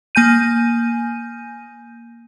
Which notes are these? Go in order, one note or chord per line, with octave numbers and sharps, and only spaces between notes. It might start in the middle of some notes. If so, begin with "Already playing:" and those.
A#3 G#5 G6 D#7